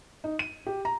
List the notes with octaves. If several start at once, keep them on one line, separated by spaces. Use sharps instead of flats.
D#4
D#7
G4
A#5